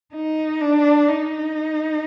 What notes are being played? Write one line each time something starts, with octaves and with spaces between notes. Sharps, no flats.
D#4
D4
D#4